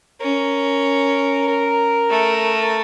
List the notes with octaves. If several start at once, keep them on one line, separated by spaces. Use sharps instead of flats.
C#4 A#4
A#4
A3